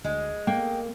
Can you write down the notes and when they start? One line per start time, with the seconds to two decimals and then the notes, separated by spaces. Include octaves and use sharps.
0.04 D2 G#3
0.47 A#3 G5